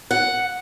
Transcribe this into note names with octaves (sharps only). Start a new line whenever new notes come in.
F#5